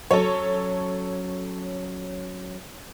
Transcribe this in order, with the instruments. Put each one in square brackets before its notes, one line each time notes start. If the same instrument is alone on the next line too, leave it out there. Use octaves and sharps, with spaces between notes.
[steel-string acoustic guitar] F#3 C#4 [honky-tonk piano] A4 C#5